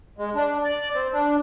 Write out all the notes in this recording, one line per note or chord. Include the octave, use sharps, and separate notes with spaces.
G#3
D4
D5
C4
D4